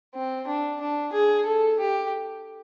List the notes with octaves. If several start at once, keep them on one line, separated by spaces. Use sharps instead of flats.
C4
D4
D4
G#4
A4
G4